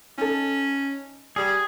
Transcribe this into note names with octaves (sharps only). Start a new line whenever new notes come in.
C#4 D#4 A4
G3 G#4